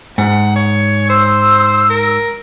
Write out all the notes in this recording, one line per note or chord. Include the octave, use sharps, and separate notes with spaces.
G#2 F#5
C#5
C5 E6
A#4